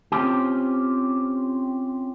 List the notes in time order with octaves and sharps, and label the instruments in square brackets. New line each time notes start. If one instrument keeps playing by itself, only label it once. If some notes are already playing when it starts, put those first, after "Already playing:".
[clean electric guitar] C4 C#4 F4 G4